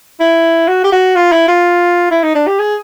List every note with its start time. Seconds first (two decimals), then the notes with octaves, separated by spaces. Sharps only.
0.20 E4
0.68 F#4
0.84 G4
0.92 F#4
1.16 F4
1.32 E4
1.48 F4
2.11 E4
2.23 D#4
2.35 D4
2.47 G4
2.59 G#4